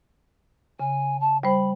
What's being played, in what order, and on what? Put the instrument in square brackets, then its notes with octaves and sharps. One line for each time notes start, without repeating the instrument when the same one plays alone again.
[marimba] C#3 [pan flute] G#5
[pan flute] A5
[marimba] G3 C5 [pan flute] B5